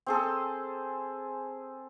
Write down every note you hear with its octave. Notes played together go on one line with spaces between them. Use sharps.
C4 G#4 A4